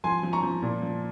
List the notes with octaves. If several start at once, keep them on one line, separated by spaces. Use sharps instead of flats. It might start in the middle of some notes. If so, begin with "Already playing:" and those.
F3 G#5 C6
F3
A#5 C#6
F3
A#2
F3